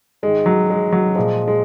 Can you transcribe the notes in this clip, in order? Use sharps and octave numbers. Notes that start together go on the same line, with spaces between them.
G#2 D#3 G#3
F#3
G#3
F#3
A#2 F3 G#3
G#3